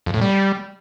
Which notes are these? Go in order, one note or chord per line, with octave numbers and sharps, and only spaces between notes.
F2
A2
G3